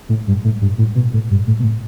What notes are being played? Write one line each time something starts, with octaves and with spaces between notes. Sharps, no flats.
A2
G2
A2
G2
A2
B2
A2
G2
A2
B2
A2